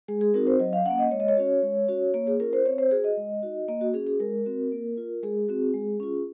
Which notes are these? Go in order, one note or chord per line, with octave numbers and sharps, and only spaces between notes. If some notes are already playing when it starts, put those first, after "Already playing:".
G#3 G#4
G#4
C4 D#4 F#4 A#4
C5
F#3 D#5
F5
A#3 C#4 F#5
D#5
G#3 C#5
D#5
C#5
C#4 F#4
G#3
C#4 F#4
A#3 C#5
G#4
C#4 F4 A#4
C5
C4 C#5
C5
F#4 G#4
D#5
G#3
D#4 F#4
A#3 D#5
F#4
C#4 F#4 G#4
G#4
G#3 A#4
C4 F#4
A#3
F4
G#3 G#4
C4 F#4
G#3
C#4 F4